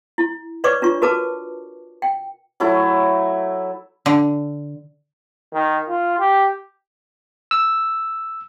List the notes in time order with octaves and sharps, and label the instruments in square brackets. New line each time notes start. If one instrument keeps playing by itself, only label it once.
[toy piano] E4
B4 C#5 D5 C#6 D6
D4 F4 C#6
F#4 A#4 B4 A5 D6
G5
[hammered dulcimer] F#3 A3 E4
[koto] D3
[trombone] D#3
F4
G4
[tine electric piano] E6